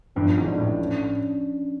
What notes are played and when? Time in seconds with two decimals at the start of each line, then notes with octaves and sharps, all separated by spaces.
0.16 G1 G2 F3
0.38 G#1 G#2
0.47 D4
0.58 A1 A2
0.78 C#4